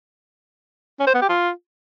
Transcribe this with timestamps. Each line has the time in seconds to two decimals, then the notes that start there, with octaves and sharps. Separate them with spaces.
0.99 C#4
1.07 C5
1.14 B3
1.22 G4
1.29 F4